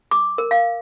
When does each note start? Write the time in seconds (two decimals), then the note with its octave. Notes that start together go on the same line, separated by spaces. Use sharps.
0.11 D6
0.38 A#4
0.51 F5